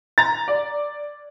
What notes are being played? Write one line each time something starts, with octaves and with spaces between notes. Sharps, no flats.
A#5 A6
D5